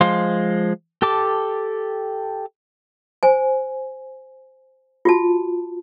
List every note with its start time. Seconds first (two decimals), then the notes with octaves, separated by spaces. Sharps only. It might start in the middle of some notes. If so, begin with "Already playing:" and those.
0.01 F3 G#3 C5 F5 C6
1.02 G4 A4 A5 D6
3.23 C5 G#5
5.05 F4 F#4 A5